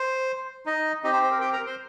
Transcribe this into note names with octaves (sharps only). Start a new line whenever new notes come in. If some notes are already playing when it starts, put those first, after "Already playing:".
Already playing: C5
D#4 D#5
C4 D#4 G4 D#5
C5
C5
A#4
G4 G5
A#4 A#5
C5 C6